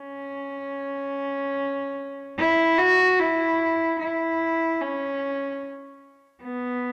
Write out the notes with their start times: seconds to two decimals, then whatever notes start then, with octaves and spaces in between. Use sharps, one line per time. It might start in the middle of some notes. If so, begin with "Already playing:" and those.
Already playing: C#4
2.38 E4
2.78 F#4
3.19 E4
4.00 E4
4.81 C#4
6.43 B3